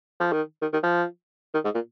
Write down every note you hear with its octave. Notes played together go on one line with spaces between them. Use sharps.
F3
D#3
D#3
D#3
F3
D#3
G#2
A#2